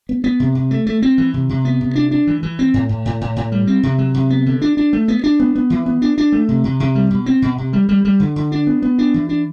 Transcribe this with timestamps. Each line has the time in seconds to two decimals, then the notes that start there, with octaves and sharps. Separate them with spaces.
0.09 B3
0.24 B3
0.40 C3
0.55 C3
0.71 A3
0.87 A3
1.02 C4
1.18 E3
1.34 C3
1.49 C3
1.65 B3
1.81 C3
1.95 D4
2.11 D4
2.27 E3
2.43 E3
2.59 C4
2.74 A2
2.89 A2
3.05 A2
3.21 A2
3.36 A2
3.52 G3
3.67 C4
3.83 C3
3.98 F#3
4.14 C3
4.30 B3
4.46 D3
4.62 D4
4.77 D4
4.93 A3
5.08 B3
5.24 D4
5.40 B3
5.56 B3
5.70 E3
5.86 B3
6.02 D4
6.18 D4
6.32 A3
6.49 C3
6.64 C3
6.80 C3
6.95 G3
7.11 B2
7.26 C4
7.42 B2
7.58 C3
7.73 G3
7.89 G3
8.05 G3
8.20 D3
8.36 D3
8.52 D4
8.67 B3
8.83 B3
8.98 D4
9.14 E3
9.29 D4